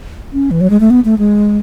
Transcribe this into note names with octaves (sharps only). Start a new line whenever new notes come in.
C#4
E3
F#3
G#3
A3
B3
A3
G#3